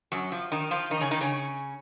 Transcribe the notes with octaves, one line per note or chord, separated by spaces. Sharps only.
F#2 F#3
F3
D#3 D#4
F3 F4
D#3 D#4
C#3 C#4
D#3 D#4
C#3 C#4